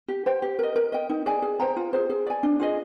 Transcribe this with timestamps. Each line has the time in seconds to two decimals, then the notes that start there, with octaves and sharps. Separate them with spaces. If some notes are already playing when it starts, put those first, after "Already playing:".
0.08 G4
0.26 C5 G5
0.42 G4
0.59 A#4 D#5
0.76 A#4
0.92 D#5 G5
1.09 D#4
1.26 G#4 D5 G#5
1.42 G#4
1.60 C5 G5 A#5
1.76 F4
1.93 G#4 C5
2.10 G#4
2.27 D5 G#5
2.43 D4
2.60 F4 G#4 D#5